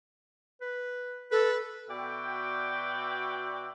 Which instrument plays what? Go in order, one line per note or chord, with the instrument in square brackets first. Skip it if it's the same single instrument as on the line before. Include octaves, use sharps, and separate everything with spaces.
[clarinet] B4
[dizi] A4 [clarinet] B4
[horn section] B2 F#4 D5 E5 G5